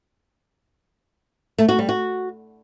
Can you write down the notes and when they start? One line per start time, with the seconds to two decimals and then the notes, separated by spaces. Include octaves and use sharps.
1.58 A3
1.69 F#4
1.79 G3
1.89 F#4